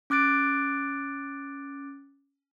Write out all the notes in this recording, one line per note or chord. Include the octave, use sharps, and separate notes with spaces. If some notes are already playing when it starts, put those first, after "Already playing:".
C#4 D6 F#6 A6 D7